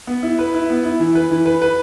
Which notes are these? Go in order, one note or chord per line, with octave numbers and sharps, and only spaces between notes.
B3
E4
B4
E4
B3
E4
E3
B4
E3
B4
B4